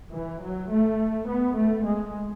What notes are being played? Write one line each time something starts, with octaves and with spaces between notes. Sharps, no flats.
E3
F#3
A3
B3
A3
G#3